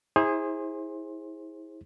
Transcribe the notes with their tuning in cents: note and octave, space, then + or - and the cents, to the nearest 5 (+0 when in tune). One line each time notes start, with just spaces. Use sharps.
E4 -30 G#4 -15 C5 +25